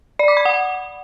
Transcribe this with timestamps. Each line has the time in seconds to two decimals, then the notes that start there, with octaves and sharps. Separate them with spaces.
0.19 D5
0.28 D6
0.37 B5
0.45 F#5